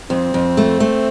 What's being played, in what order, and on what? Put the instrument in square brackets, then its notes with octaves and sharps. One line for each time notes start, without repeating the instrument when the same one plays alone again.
[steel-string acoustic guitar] F2 [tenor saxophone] C4
[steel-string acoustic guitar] F2
A3
A3